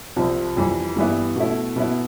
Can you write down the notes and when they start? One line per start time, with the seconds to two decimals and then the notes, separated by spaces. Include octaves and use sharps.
0.16 C2 C3 F3
0.57 F2 E3 G3
0.96 G2 E3 G3 B3 E4
1.36 B2 A3 E4
1.76 B2 B3 E4